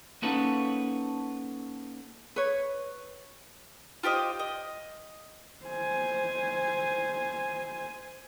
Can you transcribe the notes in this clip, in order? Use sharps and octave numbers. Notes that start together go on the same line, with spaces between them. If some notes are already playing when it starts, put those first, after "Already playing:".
A#3 C#4 D#4 F#4 A4 B4
B4 C#5
F4 G4 C5 D#5
D#5
C5 G#5